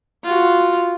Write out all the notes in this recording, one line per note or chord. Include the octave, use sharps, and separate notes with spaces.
F4 F#4